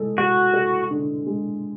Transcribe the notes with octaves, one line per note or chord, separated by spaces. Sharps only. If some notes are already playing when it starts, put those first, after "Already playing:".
Already playing: G#3 A4
F#4 A4
A4
D3
G#3